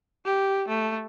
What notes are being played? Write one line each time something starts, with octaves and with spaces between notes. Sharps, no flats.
G4
A3